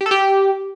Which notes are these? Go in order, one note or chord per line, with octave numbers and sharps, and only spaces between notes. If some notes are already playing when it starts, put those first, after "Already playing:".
G4
A4
G4